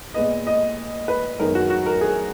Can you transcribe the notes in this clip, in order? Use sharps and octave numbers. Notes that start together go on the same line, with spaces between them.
A#2 G#3 B3 D#5
D#5
B4
F#2 D#3 G#3 B3 A#4
F#4
F#4
A#4
G#4